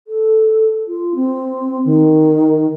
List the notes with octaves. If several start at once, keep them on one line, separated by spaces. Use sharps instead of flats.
A4
F4
C4
D#3